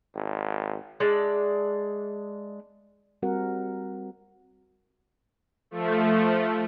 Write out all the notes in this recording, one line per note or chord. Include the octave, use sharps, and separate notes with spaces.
G#1
G#3 D4 E5
G3 C4 F#4 A#4 F#5
F3 A3